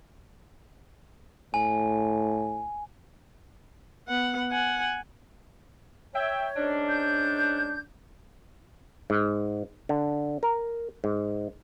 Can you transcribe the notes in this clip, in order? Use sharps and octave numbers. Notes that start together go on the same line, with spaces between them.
A2 G#5
B3 F#5
F#5 G#5
C#5 E5 G5
G#2 C#4 D4
G6
G#2
D3
A#4
G#2